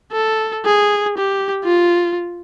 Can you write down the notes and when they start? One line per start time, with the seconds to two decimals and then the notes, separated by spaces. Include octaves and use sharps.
0.13 A4
0.66 G#4
1.18 G4
1.64 F4